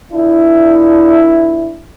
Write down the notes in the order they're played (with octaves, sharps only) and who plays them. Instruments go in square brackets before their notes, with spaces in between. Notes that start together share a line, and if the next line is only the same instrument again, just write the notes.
[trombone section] A#2 D4 E4